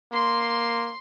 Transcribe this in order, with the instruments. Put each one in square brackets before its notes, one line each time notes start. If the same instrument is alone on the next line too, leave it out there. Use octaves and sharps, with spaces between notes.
[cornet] A#3 [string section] C6